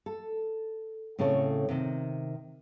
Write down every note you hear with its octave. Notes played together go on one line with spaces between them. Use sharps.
A4
A2 C#3 C4 A4 C#5
C3 D#3